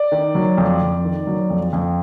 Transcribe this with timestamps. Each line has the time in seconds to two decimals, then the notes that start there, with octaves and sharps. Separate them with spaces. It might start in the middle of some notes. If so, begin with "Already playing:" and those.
Already playing: D5
0.12 D#3
0.35 F#3
0.58 F2
0.82 F2
1.05 D#3
1.27 F#3
1.50 F2
1.73 F2